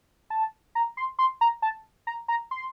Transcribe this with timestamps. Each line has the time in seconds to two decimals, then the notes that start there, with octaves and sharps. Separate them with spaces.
0.30 A5
0.75 A#5
0.97 C6
1.19 C6
1.41 A#5
1.62 A5
2.07 A#5
2.28 A#5
2.51 C6